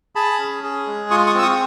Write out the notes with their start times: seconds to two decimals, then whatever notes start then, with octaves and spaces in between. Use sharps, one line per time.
0.15 G#4 A5 B5
0.39 C#4
0.64 G#4
0.87 G#3
1.11 F4 C#6 D#6
1.27 C#6 D#6
1.34 C4 E6
1.42 C#6 D#6